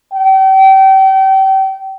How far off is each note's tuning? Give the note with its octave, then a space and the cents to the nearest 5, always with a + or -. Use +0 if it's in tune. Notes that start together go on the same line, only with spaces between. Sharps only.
G5 -35